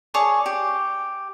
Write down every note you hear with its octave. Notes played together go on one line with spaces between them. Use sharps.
G#4 C#5 D5 A5
G4